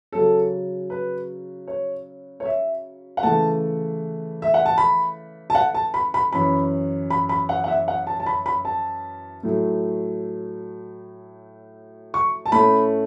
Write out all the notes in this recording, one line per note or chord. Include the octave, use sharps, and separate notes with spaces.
C#3 F#3 C#4 A4
B4
C#5
C#5
E5
F#5
C#3 E3 A3 A5
E5
F#5
A5
B5
A5
F#5
A5
B5
B5
F#2 E3 C#4 B5
B5
B5
F#5
F#5
E5
F#5
A5
A5
B5
B5
A5
A2 F#3 A3
C#6
A5
A2 A3 C#4 B5